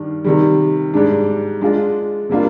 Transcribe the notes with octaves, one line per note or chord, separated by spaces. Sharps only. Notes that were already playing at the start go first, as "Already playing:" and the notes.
Already playing: G2 D#3 G3 D4
C3 D#3 G3
G#2 G3 D4
G#3 D4 F4
C3 G3 A#3 D4 F4